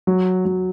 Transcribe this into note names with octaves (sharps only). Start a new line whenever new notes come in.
F#3
F#3